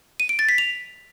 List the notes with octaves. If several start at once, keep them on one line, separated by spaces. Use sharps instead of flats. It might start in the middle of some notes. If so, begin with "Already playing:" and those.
D#7
D7
A6
B6
F7